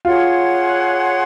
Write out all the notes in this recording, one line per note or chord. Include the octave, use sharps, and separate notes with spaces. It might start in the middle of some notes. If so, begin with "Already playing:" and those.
F4 G#4 C#5 F#5 C6